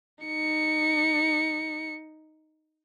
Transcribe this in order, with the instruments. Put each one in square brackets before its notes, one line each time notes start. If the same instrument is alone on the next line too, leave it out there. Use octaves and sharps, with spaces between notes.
[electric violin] D#4 C#7